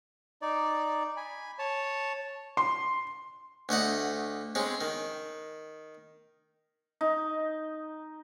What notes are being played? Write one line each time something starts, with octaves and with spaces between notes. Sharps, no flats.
D#4 D5
G#5 B5
C#5 A5
C6
D2 A3 D#5 F#5
G#3 C4 C#4
D#3
D#4